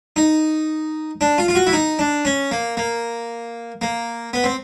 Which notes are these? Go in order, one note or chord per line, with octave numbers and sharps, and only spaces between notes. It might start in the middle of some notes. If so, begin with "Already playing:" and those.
D#4
D4
F4
F4
F#4
E4
D#4
D4
C#4
A#3
A#3
A#3
B3
C4